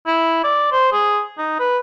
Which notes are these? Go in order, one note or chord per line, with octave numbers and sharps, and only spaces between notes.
E4
D5
C5
G#4
D#4
B4